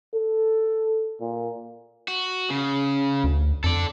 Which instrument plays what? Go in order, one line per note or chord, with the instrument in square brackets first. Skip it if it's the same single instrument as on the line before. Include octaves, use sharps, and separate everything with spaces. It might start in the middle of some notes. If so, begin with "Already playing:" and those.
[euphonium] A4
A#2
[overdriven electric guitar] F#4
C#3
[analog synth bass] D2
[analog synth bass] F2 [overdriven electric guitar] A4 D5